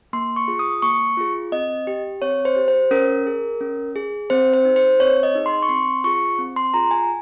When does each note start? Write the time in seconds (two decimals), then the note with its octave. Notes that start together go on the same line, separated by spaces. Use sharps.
0.13 A#3 C6
0.36 C#6
0.48 F4 G#4
0.59 D#6
0.82 A#3 C#6
1.17 F4 G#4
1.52 C4 D#5
1.87 G4
2.22 C4 C#5
2.45 C5
2.56 G4
2.68 C5
2.91 C#4 A#4
3.27 G#4
3.61 C#4
3.96 G#4
4.30 C4 C5
4.54 C5
4.65 D#4 G#4
4.76 C5
5.00 C4 C#5
5.23 D#5
5.35 D#4 G#4
5.46 C6
5.62 C#6
5.69 C4 C6
6.04 F4 G#4 C#6
6.39 C4
6.56 C6
6.74 F4 G#4 A#5
6.91 G#5